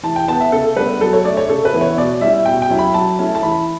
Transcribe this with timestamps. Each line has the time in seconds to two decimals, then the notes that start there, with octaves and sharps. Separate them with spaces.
0.03 E3 A5
0.16 G5
0.28 B3 E4 A5
0.40 E5
0.52 C#3 A4
0.76 G3 B3 D4 B4
1.01 F#3 A4
1.13 C#5
1.25 A3 D4 D5
1.37 C#5
1.49 C#3 A4
1.65 B4
1.74 E3 B3 E4
1.81 C#5
1.97 B2 D5
2.21 G3 C#4 E4 E5
2.45 B2 G5
2.62 G5
2.70 F#3 C#4 E4
2.79 B5
2.94 F#3 A5
3.19 A3 C#4 E4
3.35 A5
3.43 E3 B5